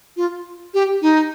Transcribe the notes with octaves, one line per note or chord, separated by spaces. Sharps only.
F4
G4
D#4